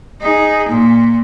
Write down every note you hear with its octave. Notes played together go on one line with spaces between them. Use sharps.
D#4 G#4
A#2